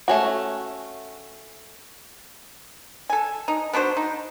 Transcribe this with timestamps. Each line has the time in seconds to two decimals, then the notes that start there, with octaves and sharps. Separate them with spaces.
0.08 A3 C#4 F#4
3.10 A4 G#5
3.48 D#4
3.73 B3 D4 F#4 C5
3.96 D#4